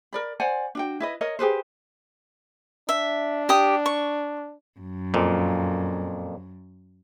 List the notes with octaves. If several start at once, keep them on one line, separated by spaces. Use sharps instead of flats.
A#4 D5 B5
C5 D5 F#5 G#5
D4 F#4 G5
E4 B4 D#5
A#4 C#5 D#5
G4 G#4 B4 C5
D4 E5
G4 D#6
C#6
F#2
F2 A#2